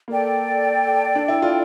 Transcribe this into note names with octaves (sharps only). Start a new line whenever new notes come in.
A#3 A4 D5 G5
D4
E4
F4